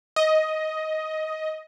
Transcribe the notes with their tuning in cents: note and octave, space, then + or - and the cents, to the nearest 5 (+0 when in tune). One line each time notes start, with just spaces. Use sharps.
D#5 +10